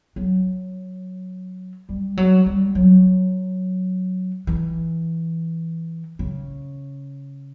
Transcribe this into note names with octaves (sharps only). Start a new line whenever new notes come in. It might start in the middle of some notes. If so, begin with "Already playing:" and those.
F#3
G3
F#3
G3
F#3
E3
C#3